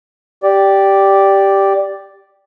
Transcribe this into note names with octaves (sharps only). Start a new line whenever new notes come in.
G4 D5